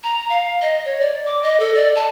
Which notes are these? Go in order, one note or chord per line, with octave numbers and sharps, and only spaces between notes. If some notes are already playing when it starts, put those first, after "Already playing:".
A#5
F5
D#5
C#5
D5
D6
D#5
A4
D5
A5